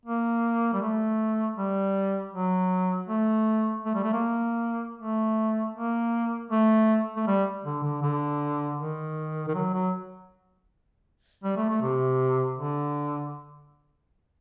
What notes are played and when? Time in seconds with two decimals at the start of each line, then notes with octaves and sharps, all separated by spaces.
0.05 A#3
0.73 G3
0.82 A3
1.57 G3
2.33 F#3
3.09 A3
3.85 A3
3.95 G3
4.04 A3
4.13 A#3
4.98 A3
5.74 A#3
6.51 A3
7.16 A3
7.27 G3
7.64 D3
7.83 D3
8.02 D3
8.78 D#3
9.48 D#3
9.55 F#3
9.74 F#3
11.44 G3
11.57 A3
11.69 A3
11.82 C3
12.58 D3